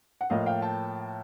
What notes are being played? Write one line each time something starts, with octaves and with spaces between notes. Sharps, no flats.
F#5
A2 F3 A#3 D#5 F5
F5 G5
G5 A5